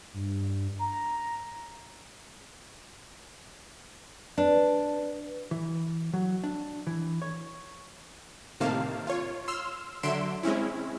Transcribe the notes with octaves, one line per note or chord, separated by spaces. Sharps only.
G2
A#5
D4 B4
E3
F#3
D4
E3
C#5
A2 C3 D#3 A#3 F5 A5
F4 C#5
C6 E6 F6
D3 F#3 E5 C6 D7 E7
G#3 C4 C#4 E4